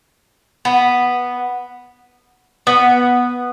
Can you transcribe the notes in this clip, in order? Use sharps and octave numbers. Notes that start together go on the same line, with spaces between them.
B3
B3